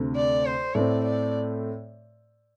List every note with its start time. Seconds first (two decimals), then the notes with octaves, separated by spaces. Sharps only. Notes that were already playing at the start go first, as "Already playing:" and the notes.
Already playing: D2 C3 A3
0.16 D5
0.45 C5
0.75 A2 A3 C4 D5
1.04 D5